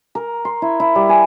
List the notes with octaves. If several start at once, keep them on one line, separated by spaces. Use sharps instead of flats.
A#4
C6
E4
E4
G3
G#5